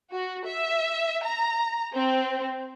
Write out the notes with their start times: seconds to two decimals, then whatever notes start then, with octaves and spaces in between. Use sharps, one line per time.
0.11 F#4
0.46 E5
1.25 A#5
1.94 C4